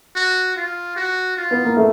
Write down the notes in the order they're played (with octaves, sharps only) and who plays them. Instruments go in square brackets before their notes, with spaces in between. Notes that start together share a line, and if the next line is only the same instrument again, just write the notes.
[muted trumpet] F#4
F4
F#4
F4
[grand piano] B3
A#3
A3